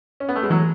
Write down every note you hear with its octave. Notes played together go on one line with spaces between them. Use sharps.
C#4
B3
A3
G#3
E3 F#3